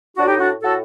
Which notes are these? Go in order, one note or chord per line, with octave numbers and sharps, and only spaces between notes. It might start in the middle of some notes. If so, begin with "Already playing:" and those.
A2 D4 F#4
D#4 G4
D4 F#4
A2 F#4 A4